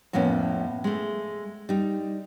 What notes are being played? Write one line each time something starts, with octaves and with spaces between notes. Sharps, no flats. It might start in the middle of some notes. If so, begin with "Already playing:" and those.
F2 A2 A#3 B3 C#4
G#3 A3
G3 D#4